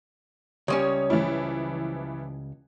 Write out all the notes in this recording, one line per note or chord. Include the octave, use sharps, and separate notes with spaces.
C#2 G3 C#4 C#5 D#6
E3 F3 E4